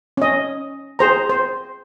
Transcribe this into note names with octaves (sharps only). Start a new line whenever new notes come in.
C#4 D#5
G#4 C5 A#5
C5